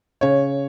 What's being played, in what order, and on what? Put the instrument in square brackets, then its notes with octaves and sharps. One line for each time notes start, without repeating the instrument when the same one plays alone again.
[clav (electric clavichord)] C#3 [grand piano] C#5